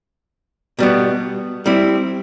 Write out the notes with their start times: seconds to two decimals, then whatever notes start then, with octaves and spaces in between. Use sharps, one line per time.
0.79 B2 G3 B3
1.66 G3 C4 E4